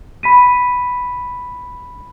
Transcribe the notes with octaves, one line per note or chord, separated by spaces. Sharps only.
B5 B6 D#7